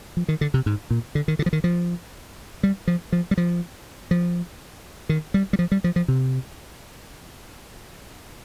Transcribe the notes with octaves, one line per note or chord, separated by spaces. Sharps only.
F3
D#3
D3
C3
G#2
A#2
D3
D#3
D3
F3
D#3
F3
G3
F3
F3
G3
F3
F3
D#3
G3
G3
F3
G3
F3
F3
C3